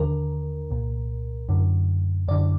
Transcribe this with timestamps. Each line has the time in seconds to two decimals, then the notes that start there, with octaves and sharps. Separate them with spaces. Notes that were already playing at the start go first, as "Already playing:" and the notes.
Already playing: D#2 D3 A#4
0.71 C2 A#2
1.49 F#2 D3
2.28 F#2 D3 D5